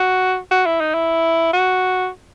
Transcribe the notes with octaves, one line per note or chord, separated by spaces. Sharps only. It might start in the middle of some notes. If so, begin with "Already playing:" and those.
Already playing: F#4
F#4
E4
D#4
E4
F#4